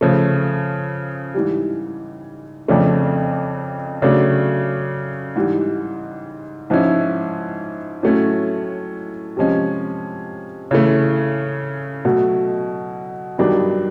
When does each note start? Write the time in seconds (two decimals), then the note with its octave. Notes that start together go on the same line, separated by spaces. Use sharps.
0.01 C#3 F3 A3
1.34 G#2 E3 G3
2.68 F2 C#3 F3 A3 D4
4.02 C#3 F#3 A3 D4
5.36 G#2 E3 G3
6.70 G#2 F3 G#3 C#4 E4
8.03 A2 F#3 A3 C#4
9.37 C3 F3 G#3 C#4
10.71 C#3 E3 A3
12.05 B2 F#3 A3
13.38 G2 D#3 F#3 B3 D4